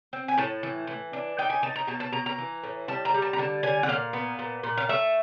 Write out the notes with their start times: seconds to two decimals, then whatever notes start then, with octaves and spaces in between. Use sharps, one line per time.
0.13 C4
0.28 G#5
0.38 A2 A5
0.63 E3
0.87 E3
1.13 D4
1.38 D#4 G5
1.50 G#5
1.62 D#4 A5
1.76 A#5
1.87 B2 A5
2.00 A5
2.12 B2 A#5
2.26 A#5
2.38 E3
2.63 A2
2.88 G3 A5
3.05 A#5
3.14 G3
3.22 A5
3.33 A#5
3.38 D3 A5
3.63 D3 G#5
3.83 F#5
3.89 A#2 F5
4.13 B3
4.39 A#2
4.63 A#2
4.78 F5
4.89 A3 E5